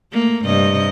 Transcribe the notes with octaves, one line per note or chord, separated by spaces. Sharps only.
A3 A#3
G2 C3 D#5